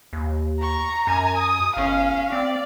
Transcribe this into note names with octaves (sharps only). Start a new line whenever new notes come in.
D#2
A#5 C#6
F#2 G#5
D#6
G1 C#4 F5
C4 D5